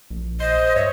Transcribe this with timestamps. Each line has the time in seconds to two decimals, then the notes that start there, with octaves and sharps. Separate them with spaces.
0.10 A#1
0.40 C5 D#5
0.76 G2 C#5 E5